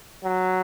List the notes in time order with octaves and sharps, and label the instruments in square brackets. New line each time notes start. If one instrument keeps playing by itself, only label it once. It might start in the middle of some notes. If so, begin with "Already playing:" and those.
[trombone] F#3